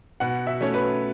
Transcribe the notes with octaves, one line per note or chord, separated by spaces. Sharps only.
B2 F#5
E5
A3 C#4 C#5
B4